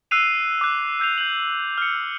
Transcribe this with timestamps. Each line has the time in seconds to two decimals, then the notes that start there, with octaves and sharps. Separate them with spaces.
0.11 E6 F#6 C7 D#7 F7
0.61 D6 F#6
1.00 E6 G6 C7 F7
1.18 G6 F#7
1.78 F6 C#7